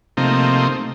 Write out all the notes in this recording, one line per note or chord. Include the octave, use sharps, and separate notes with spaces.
C3 F3 A3 A#3 C4 D#4